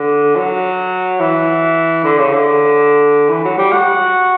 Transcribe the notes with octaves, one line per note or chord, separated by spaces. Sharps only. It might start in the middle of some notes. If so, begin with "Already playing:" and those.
Already playing: D3
F#3
E3
D3
C#3
D3
E3
F#3
G3
F#4